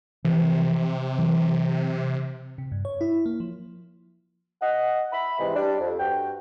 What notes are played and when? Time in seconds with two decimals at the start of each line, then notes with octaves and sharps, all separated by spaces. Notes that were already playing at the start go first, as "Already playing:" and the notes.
0.25 C3 E3 F3
1.18 E3 F#3
2.58 C3
2.72 G2
2.85 C#5
3.01 E4
3.26 A#3
3.40 F3
4.62 D#5 F#5
5.12 E5 B5
5.39 G#2 C3 E3 G#3
5.56 G3 D4
5.81 F2
5.99 G2 F#4 G5